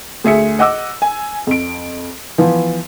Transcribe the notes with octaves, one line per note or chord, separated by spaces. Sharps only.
D2 G#4 E5 C#7
D#5 F#5 D6 E6
G#5
F2 D7
E3 F3 B3